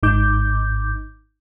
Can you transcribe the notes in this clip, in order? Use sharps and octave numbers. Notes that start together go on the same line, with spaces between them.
G#1 G#2 D#4 D6 G6